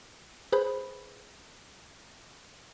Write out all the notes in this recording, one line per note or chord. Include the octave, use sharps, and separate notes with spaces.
G#4 B4 C5 B5